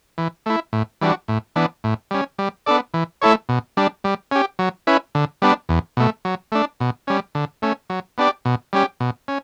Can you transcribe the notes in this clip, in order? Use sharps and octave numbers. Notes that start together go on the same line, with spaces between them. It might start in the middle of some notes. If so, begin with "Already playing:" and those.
E3
A3 E4
A2
E3 G3 D4 F#4
A2
E3 B3 D4
A2
G3 C#4
G3
B3 D4 A4 D5
E3
A3 E4 A4 C#5
B2
G3 D4
G3
C#4 G4
F#3
C#4 E4 B4
D3
G3 B3 D4
E2
B2 A3
F#3
A3 D4
B2
G3 C#4
D3
A3 C#4
F#3
B3 D4 G4 D5
B2
G3 C#4 G4
B2
C#4